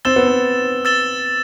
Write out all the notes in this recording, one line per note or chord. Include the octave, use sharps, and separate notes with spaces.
C4 E6 A6 E7 G7
B3
C4
E6 A6 E7 G7